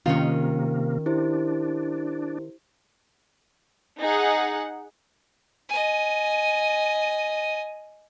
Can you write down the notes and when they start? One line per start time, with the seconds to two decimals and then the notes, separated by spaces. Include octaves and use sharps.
0.06 C3 D#3 A#3 C#4 F4
1.06 D4 E4 G4 C5
4.00 D#4 G#4 F#5
5.69 D#5 G#5